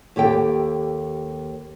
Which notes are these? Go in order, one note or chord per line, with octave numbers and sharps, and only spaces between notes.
D#2 G4 A4 G5